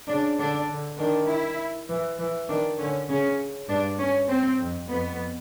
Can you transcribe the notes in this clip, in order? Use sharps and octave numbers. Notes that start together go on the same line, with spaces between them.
C#3 D4
D3 D4
D3
D#3 D4
E4
E3
E3
D#3 D4
D3 C#4
C#3 C#4
G2 D4
C#4
C4
F2
F2 B3